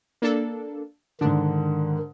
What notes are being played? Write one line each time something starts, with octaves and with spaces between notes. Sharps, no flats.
A#3 D4 A4
G#2 D3 D#3 D4